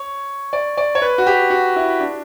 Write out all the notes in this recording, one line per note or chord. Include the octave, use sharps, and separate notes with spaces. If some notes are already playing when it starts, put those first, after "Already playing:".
Already playing: C#5
D5
D5
C#5
B4
F#4
G4
F#4
E4
D4